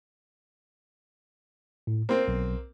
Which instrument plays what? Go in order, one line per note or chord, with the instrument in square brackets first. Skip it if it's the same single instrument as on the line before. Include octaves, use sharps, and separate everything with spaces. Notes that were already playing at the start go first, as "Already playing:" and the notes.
[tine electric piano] A2
[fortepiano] A#3 C4 [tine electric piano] C5
[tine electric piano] B1